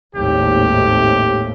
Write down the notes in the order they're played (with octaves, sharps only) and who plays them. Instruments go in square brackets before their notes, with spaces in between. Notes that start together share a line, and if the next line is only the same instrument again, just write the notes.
[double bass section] G#1 D#2 A2 [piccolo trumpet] G4